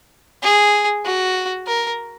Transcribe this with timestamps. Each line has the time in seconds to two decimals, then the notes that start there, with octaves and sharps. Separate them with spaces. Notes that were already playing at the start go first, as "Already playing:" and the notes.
0.42 G#4
1.05 F#4
1.67 A#4